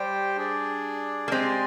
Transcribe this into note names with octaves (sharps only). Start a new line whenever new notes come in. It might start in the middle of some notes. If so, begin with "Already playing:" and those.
Already playing: G3 G4 C5 G5
D4 G#4 D5
A#3
G#3 C4 G4 D5 G#5